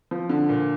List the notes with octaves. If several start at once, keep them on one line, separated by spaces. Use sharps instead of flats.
F3
D3
A#2